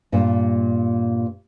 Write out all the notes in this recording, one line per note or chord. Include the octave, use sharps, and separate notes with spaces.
G2 A#2